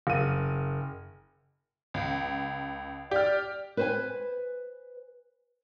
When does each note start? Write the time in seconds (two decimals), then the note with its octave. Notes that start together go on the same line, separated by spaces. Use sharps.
0.07 F#1 D#7
1.94 C#2
3.11 G4 D5 F6
3.77 B4 C5 G#5